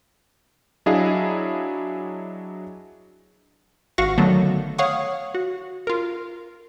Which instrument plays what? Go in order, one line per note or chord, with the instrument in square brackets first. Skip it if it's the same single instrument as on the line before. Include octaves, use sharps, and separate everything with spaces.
[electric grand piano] F#3 D4 E4 G#4 D#5 F5
[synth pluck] G#1 F#4 F5 F#5 C#6 A#6
D3 D#3 F#3 A3 B3
C#5 F5 F#5 C#6 D#6
F#4
F4 A#4